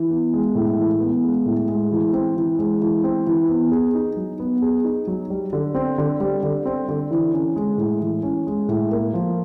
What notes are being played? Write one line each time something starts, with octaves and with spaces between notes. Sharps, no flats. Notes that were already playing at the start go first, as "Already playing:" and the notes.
Already playing: E3
B3
G#3
A2
E3
B3
G#3
A2
G#3
E3
C4
E3
G#3
E3
C4
E3
B3
G#4
D#4
F#3
B3
G#4
D#4
F#3
G3
D3
C4
D3
G3
D3
C4
D3
E3
C#4
G#3
A2
E3
C#4
G#3
A2
A#3
F3